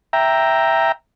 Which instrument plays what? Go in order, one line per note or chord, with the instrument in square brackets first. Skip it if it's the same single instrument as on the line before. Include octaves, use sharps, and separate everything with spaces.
[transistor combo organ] E5 G5 A#5